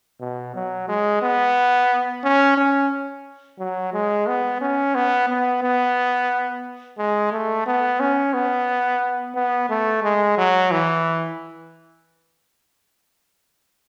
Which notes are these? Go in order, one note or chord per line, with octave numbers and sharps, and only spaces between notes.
B2
F#3
G#3
B3
C#4
C#4
F#3
G#3
B3
C#4
B3
B3
B3
G#3
A3
B3
C#4
B3
B3
A3
G#3
F#3
E3